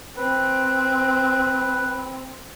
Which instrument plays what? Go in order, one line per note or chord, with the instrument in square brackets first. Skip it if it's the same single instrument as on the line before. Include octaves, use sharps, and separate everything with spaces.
[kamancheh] C4 [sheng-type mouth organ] B4